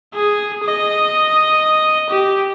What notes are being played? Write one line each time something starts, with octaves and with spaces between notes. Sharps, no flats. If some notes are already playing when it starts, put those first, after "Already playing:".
G#4
D#5
G4